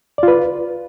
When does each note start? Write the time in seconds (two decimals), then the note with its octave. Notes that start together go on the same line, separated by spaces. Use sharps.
0.18 D5
0.23 F4
0.28 B4